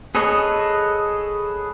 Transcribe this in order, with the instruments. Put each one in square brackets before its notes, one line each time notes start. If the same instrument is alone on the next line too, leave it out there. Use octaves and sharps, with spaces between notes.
[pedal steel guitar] G#4 A4 B4 C#5 D#5